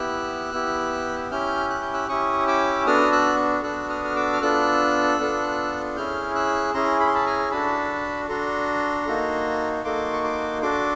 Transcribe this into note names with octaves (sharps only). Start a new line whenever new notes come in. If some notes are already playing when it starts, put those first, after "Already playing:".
Already playing: B3 E4 G4 E6 F#6
B3 E4 G4
C#4 E4 G4 F6 G6
F#6
G6
E6 F#6
C#4 E4 G4 C#6 D#6
D6 E6
B3 D4 F#4 A4 D#6 F6
E6 F#6
B3 D4 F#4 A4 E6 F#6
D#6 F6
F6
D6 E6
F6
B3 D4 F4 A4 E6 F#6
B3 D4 F4 A4
C#4 E4 G#4 F6 G6
E6 F#6
C#4 E4 G#4 A#5 C6
B5
C6
A5 B5
G#5 A#5
D4 F#4 A4 A5 B5
D4 F#4 A4 A#5 C6
A#3 D#4 F#4 A4
A#3 D#4 F#4 A4 C6 D6
C#6
C6 D6
D4 F#4 A4 C6 D6